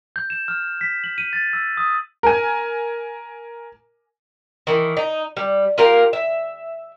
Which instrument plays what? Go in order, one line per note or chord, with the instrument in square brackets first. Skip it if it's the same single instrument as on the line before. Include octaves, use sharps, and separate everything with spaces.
[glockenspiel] G6
E7
F6
B6
F#7
D#7
A6
E6
D#6
[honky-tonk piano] A#4 G#5
[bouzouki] D#3 E3
D#4
G3
F4 G4 A#4 F5
E5